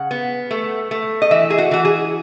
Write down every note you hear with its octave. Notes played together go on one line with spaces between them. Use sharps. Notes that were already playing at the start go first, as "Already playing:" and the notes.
Already playing: C#3 F#5
B3
A3
A3
D#5
E3 E5
G#4
F#4
E3 F#4
G#4